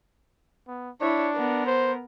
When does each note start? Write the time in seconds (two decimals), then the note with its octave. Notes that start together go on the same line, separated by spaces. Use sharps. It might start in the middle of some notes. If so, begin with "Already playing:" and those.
0.67 B3
1.01 D4 E4 C#5
1.35 B3 A#4
1.66 C5